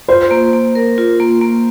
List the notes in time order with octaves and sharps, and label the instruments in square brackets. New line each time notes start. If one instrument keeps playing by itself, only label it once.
[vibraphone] F4 [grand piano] C5
[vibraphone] A#3
A#3
A#4
F4
A#3
A#3